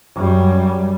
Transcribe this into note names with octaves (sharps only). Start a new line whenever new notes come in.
F#2 G3